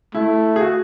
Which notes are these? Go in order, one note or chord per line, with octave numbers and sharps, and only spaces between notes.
A3 E4
G#4
F#4